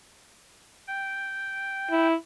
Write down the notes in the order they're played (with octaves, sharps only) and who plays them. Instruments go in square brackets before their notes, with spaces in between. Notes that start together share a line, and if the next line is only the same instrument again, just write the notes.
[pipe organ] G5
[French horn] E4